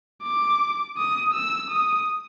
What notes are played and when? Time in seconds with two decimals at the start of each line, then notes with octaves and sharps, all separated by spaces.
0.23 D6
0.97 D#6
1.34 E6
1.71 D#6